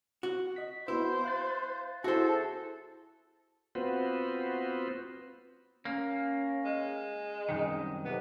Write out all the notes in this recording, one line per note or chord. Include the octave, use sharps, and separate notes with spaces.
F#4
D#5 B6
B3 E4 F#4 B4 C5
F5 F#6 A6
E4 F#4 G#4 A4 C5
B3 C4 F4 F#4 B4 C5
A#3 C#4
G#3
C2 F#2 D#3 D#5
F2 C3 B3